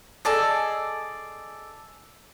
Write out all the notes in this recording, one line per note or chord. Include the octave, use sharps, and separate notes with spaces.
G#4 A4 D5 D#5